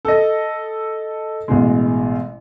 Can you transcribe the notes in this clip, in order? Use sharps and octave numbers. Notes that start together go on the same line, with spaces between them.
A4 D#5
A1 B2 G#3